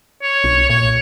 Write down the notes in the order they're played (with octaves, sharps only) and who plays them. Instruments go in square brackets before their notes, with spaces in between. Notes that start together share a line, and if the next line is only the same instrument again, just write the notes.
[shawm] C#5
[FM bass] B1
[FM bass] A#2 [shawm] C#5